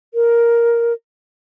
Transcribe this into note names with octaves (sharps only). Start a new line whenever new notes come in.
A#4